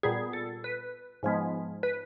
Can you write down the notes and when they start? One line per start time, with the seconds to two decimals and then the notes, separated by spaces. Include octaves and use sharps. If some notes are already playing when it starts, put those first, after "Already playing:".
0.03 A#2 G3 B3 G#4
0.33 A4
0.64 B4
1.23 G#2 F3 G#3 B3
1.83 B4